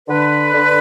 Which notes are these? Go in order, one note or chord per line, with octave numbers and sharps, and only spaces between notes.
D3 B4
D3